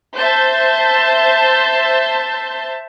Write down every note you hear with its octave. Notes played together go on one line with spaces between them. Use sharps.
C5 E5 A5 G6